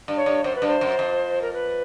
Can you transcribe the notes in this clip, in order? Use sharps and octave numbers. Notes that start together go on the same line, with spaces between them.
G2
C#5
G2
F#2 C5
B4
G2
C5
F#2
F2
A#4
B4